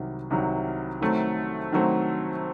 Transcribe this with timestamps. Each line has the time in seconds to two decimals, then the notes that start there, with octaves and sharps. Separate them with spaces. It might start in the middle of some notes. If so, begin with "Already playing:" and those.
Already playing: C2 C3 D#3 F#3
0.30 C2 C3 D#3 F#3
1.01 D#3 F#3 A3 C4
1.72 D#3 F#3 A3 C4